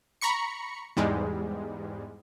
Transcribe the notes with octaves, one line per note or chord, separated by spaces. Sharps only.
A#5 B5 C#6 C#7
E2 G#2 G3 G#3